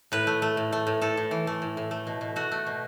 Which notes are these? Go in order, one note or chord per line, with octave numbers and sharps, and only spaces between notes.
A2 B4
A3
A3
A2
A3
A2
A2 A4
A2
E3
A3
A2
A2
A3
B2
B2
A3 F#4
A3
B2